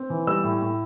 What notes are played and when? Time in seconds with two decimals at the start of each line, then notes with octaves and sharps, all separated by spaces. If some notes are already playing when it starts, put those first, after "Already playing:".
Already playing: C4
0.10 E3
0.27 G3 E6
0.44 A2
0.62 A2